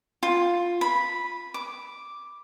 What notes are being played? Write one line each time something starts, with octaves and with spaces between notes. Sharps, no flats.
F4
B5
D6